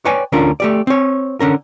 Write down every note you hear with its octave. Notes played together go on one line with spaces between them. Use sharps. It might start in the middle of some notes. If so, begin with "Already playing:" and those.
B4 C#5 D5 G5 G#5
D2 D3 C#4 D4 F4 A#4
A3 G4 D5
C4 C#5
D3 C#4 A#4